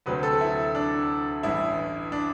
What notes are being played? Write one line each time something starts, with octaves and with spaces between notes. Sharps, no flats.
D2 C3 F#3 C4 B4
A4
E4
D4
A1 G2 E3 E4
D4